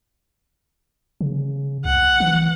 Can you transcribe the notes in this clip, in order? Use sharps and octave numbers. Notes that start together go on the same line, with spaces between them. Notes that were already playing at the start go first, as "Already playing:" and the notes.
C#3
C2 F#5
E3